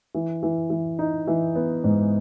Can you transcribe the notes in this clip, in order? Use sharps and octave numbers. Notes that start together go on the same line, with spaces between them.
E3
E3
E3
D#4
E3
B3
G#2